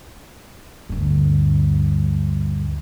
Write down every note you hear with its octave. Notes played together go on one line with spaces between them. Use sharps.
D2 G2